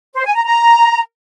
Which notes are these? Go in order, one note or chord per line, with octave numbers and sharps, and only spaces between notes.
C5
G#5
A#5
A#5